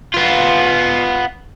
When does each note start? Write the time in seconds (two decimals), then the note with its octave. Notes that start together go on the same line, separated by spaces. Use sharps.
0.14 B3 F4